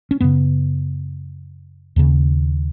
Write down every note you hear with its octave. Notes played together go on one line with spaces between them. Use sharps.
C#4
F#2 C#3 B3
D#2 C#3